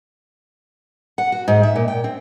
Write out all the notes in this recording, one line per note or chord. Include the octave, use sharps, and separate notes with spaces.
F#5
F#4
G#2
E5
A#2
G5
C4